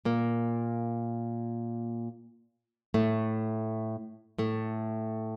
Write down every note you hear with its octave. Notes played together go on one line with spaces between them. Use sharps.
A#2 A#3
A2 A3
A2 A3